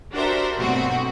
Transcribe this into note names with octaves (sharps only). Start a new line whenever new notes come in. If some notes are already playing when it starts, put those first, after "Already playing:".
D4 F#4 G4 A#4 C5 E5
G2 B2 F#3 A3 C4 F#4